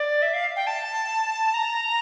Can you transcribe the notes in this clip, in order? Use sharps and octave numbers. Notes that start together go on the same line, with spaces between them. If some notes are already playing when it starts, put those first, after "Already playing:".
Already playing: D5
E5
F5
G5
A5
A#5